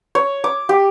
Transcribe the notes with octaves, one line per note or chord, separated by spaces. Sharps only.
C#5
D6
G4